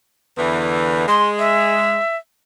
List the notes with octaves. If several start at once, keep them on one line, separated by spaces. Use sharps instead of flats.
E2 D3 E3
G#3 C6
E5